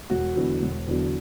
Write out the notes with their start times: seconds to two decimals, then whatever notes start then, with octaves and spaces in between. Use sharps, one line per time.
0.10 E1 F#4
0.35 E2 D3 F#3
0.62 E1
0.87 E2 D3 F#3